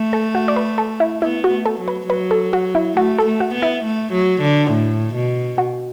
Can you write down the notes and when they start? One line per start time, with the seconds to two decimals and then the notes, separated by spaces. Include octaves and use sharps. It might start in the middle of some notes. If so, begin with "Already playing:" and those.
Already playing: A3
0.13 A4
0.35 F#4
0.48 D5
0.56 B4
0.78 A4
1.00 E4
1.22 B3 E4
1.44 F#4
1.50 A3
1.66 A4
1.80 F#3
1.88 B4
2.09 F#3 B4
2.31 A4
2.53 F#4
2.75 E4
2.96 A3 F#4
3.18 A4
3.26 A3
3.40 F#4
3.54 B3
3.62 E4
3.84 A3
4.13 F#3
4.42 D3
4.71 A2
5.15 B2
5.58 F#4